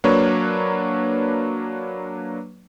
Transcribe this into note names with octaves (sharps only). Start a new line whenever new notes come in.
F#3 A#3 D4 B4 C#5